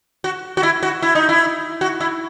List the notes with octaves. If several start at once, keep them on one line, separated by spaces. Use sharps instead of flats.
F#4
F#4
E4
F#4
E4
D#4
E4
F#4
E4